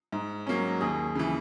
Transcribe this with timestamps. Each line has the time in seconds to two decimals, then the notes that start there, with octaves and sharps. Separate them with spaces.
0.12 G#2
0.47 F#3 A#3 C#4
0.81 D#2 G#4
1.15 C#3 E3